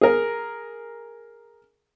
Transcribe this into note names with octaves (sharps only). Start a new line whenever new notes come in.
G#4 A#4